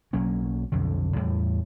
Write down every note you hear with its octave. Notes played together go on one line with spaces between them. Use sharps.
B1 F#3 A#3 C#4
B1 F2 D3
E2 A2 G3